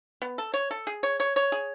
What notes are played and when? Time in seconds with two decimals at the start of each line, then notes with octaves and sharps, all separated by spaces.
0.22 B3
0.38 A4
0.54 C#5
0.71 A4
0.87 G#4
1.03 C#5
1.20 C#5
1.36 C#5
1.52 G#4